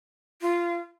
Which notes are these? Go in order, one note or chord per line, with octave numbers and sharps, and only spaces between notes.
F4